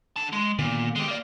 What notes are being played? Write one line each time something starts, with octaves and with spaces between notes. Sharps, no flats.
D3 A5
G#3
A#2 D3 D#3 B3
G#3 G4
A#3 D5